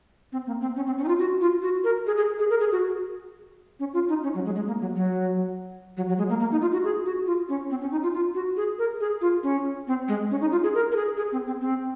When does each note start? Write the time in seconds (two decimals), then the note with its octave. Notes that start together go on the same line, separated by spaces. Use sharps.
0.32 C4
0.47 A#3
0.61 C4
0.76 C#4
0.86 C4
0.98 C#4
1.04 D#4
1.08 F4
1.19 F#4
1.41 F4
1.62 F#4
1.84 A#4
2.07 G#4
2.17 G#4
2.39 G#4
2.50 A#4
2.60 G#4
2.72 F#4
3.80 C#4
3.94 F4
4.09 D#4
4.23 C#4
4.35 F#3
4.45 G#3
4.55 G#3
4.67 A#3
4.81 F#3
4.96 F#3
5.97 F#3
6.08 F#3
6.18 G#3
6.29 A#3
6.40 A#3
6.51 D#4
6.61 F4
6.73 F#4
6.84 G#4
7.06 F#4
7.26 F4
7.49 C#4
7.70 C4
7.81 C#4
7.92 D#4
8.03 F4
8.14 F4
8.35 F#4
8.57 G#4
8.79 A#4
9.00 G#4
9.21 F4
9.43 C#4
9.87 C4
10.08 G#3
10.31 C#4
10.41 D#4
10.52 F4
10.64 G#4
10.74 A#4
10.92 A#4
10.96 G#4
11.17 G#4
11.32 C4
11.47 C4
11.61 C4